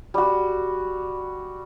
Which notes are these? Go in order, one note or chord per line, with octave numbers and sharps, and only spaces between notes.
G3 F#4